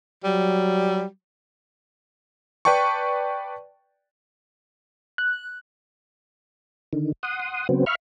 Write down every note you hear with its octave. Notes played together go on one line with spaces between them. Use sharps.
F#3 G3
B4 D5 G5 A5 C#6
F#6
D3 D#3
F#5 C6 D#6
C#3 F#3 B3 C4
E5 F5 B5 C#6 F6